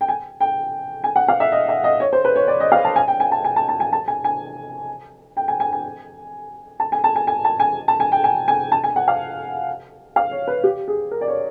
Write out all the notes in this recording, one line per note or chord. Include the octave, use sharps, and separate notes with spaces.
G5
G#5
G5
G#5
F#5
F5
E5
D#5
E5
D#5
C#5
C5
B4
C#5
D5
D#5
F5
A5
G#5
G5
G#5
A5
G#5
A5
A5
G#5
A5
G#5
G#5
G5
G#5
G#5
G#5
A5
G#5
A5
G#5
G#5
A5
G#5
A5
G#5
G5
G#5
G#5
A5
G#5
F#5
F5
F5
C#5
B4
G4
G#4
A#4
D5
C#5